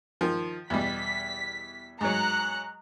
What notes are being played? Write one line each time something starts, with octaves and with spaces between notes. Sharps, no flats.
D#3 F3
E2 B2 G3 B6
G#2 F#3 A#5 F#6 C#7